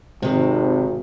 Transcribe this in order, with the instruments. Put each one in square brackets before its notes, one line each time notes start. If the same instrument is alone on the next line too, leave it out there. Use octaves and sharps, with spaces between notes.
[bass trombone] G#1 [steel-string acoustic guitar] C3 D#3